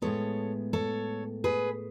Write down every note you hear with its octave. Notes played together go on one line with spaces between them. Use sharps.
A2 G#3 B3 A4 C#5
A4 C#5
G#4 B4